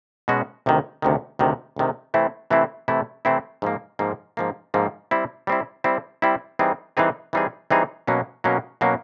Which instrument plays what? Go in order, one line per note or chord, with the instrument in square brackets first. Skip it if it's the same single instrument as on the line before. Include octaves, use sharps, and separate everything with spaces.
[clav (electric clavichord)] B2 G#3 C#4 F#4
D2 C3 D#3
D2 C3 D#3
D2 C3 D#3
D2 C3 D#3
C3 E3 A3 C4 E4
C3 E3 A3 C4 E4
C3 E3 A3 C4 E4
C3 E3 A3 C4 E4
G#2 F3 A#3
G#2 F3 A#3
G#2 F3 A#3
G#2 F3 A#3
G3 C4 E4
G3 C4 E4
G3 C4 E4
G3 C4 E4
E3 G3 C4 D#4 G#4
E3 G3 C4 D#4 G#4
E3 G3 C4 D#4 G#4
E3 G3 C4 D#4 G#4
B2 F#3 A#3 C#4
B2 F#3 A#3 C#4
B2 F#3 A#3 C#4